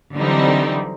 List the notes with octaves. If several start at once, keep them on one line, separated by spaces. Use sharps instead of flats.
D3 E3 F#3 G3 C4 D#4